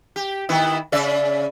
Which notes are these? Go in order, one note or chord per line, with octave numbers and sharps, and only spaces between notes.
G4
D#3 B3 E4
C#3 D5 E5